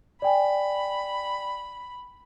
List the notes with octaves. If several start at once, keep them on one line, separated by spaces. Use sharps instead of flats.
D5 G5 G#5 B5